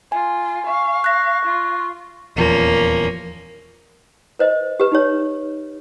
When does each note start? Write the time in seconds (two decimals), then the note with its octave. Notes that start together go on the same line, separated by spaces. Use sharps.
0.12 F4 G#5
0.66 F5 C#6
1.04 F#6 A#6
1.45 F4
2.36 D#1 E2 F3 A#3 C#4
4.39 B4 C5 D#5
4.80 G4 B4
4.92 D#4 G4 C#5